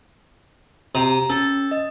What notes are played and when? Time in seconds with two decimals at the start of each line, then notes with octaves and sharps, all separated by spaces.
0.95 C3 A#5
1.30 C#4 A4
1.71 D#5